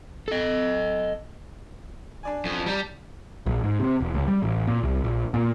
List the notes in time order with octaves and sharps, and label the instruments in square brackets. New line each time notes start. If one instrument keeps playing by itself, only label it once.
[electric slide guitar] A4 D#5
[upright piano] D4 D5 G#5
[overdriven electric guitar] F2
[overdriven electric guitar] G3 [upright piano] A5 A#5
[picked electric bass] A#1
G#2
C3
E1
C#2
G3
A1
A#2
C2
A#1
A#2